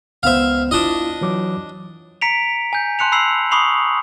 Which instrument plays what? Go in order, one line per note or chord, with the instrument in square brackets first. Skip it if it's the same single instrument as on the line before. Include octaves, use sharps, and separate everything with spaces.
[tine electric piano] C#2 B3 C5 [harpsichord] E5 F5
[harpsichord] D4 D#5 [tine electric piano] E4 F4
[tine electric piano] E3 F#3 D6
[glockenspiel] A#5 B6 C#7 D7 F7
G#5 G6
A5 C6 F#6 C#7 F7
B5 E6 C7 F7 F#7
B5 C#6 D#6 C7 F7 F#7